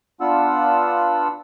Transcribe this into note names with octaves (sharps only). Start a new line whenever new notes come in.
B3 D4 F4 F#5 E6